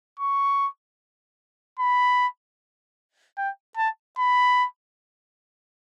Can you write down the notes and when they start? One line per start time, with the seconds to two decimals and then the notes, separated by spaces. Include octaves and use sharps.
0.20 C#6
1.80 B5
3.38 G5
3.77 A5
4.18 B5